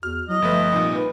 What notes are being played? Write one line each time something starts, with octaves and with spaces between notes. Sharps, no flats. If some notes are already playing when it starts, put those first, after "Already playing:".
E2 F#4 F6
F#3 E4 D#5
G1 F3 A3 B4 E5
C2 A#2 D#4
B4